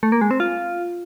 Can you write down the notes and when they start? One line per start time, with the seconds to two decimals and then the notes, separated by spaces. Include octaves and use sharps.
0.03 A3
0.12 A#3
0.21 G#3
0.31 C4
0.40 F4